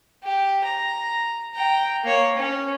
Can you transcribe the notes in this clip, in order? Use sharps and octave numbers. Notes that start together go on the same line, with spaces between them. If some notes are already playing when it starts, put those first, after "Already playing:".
G4
A#5
G5 A#5
A#3 C#5
C#4